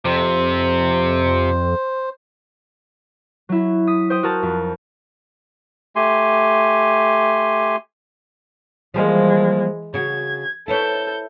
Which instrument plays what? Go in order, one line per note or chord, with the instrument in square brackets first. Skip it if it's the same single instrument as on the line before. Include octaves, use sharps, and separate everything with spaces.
[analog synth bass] F2 [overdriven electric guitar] C3 [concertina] C5
[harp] F#3 E4
D#6 B6
C5 G5 D#6
F#4 A#4 A5 A6
F2
[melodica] A3 G4 G#5 C6
[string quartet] E3 G#3 [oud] F3 G3 A#3
[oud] C#3 F#4 [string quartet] G#6
[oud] E4 B4 C#5 [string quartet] A4 G6